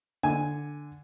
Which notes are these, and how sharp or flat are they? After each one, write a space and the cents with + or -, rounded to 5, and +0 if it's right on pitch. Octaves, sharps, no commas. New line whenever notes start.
D3 +0 G#5 +0